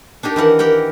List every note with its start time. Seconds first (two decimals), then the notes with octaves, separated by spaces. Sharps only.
0.23 D4 D#4 G4 A#4
0.36 D#3 E3 A#4 F#5
0.59 G4 A#4 F#5 G5